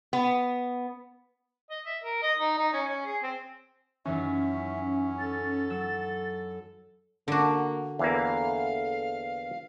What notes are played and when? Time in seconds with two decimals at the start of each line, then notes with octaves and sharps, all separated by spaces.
0.13 B3
1.70 D#5
1.86 E5
2.04 A#4
2.23 D#5
2.39 D#4
2.58 D#4
2.73 C#4
2.88 C#4
3.05 G#4
3.23 C4
4.05 F#2 D#3 E3 C#4 E5
5.19 A4 A6
5.70 F#3 E6 E7
7.28 D3 A#3 F#4
7.99 E2 E3 A#3 A4 F5